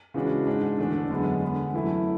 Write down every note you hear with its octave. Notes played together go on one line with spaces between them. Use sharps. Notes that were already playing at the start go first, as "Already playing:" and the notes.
C#3 E3 G#3 D4 F#4
G#2 G#3 D4
E2 D3 A3 D4 A4
F#2 D3 G#3 B3
D3 G#3 B3
F#2 E3 A3 E4